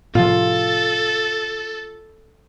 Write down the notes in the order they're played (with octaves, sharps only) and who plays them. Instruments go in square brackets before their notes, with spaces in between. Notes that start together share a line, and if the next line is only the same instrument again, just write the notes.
[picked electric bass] A2 C3 F3 [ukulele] F4 [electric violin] A4